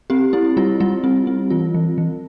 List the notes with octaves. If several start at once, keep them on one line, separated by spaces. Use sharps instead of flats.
C4 G4
C4 E4
G3 F4
G3 F4
C4
C4
E3 F4
E3
E3